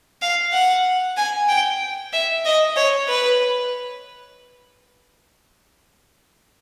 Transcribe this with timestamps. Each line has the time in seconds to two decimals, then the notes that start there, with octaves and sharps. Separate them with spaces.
0.22 F5
0.53 F#5
1.17 G#5
1.49 G5
2.13 E5
2.45 D#5
2.76 C#5
3.08 B4